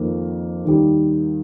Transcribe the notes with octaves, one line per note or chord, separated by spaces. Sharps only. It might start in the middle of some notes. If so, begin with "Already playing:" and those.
Already playing: F2 D#3 A#3
D#2 D#3 G3